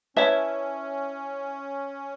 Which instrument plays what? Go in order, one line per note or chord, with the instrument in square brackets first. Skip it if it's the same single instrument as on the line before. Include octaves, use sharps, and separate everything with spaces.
[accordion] C#4 [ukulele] E4 E5 A5 [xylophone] B4 C#5